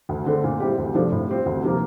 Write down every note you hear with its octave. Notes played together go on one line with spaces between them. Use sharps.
D2
D3 A3 C4
A#2
G3 C4 E4 G4
D2
C3 F3 A3 D4
A2
G3 C4 F4
D2
C3 F3 A#3